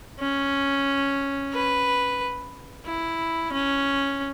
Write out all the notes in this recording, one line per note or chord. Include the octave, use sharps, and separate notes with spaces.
C#4
B4
E4
C#4